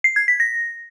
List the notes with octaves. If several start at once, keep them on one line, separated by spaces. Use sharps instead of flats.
C7
G#6
B6
A#6